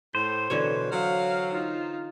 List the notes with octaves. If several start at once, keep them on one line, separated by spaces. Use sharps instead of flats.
A2 C5
B2 D3 E3 C#5
F#3 F5
D#4 F4